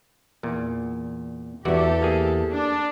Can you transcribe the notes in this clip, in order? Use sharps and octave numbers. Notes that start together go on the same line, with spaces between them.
E2 A#2
E2 E3 F#4 G4 A4 D5 E5
A#3 G#4
D4